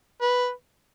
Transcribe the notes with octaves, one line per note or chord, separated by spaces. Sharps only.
B4